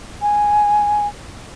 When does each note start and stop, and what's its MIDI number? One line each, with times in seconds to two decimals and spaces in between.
0.22 1.07 80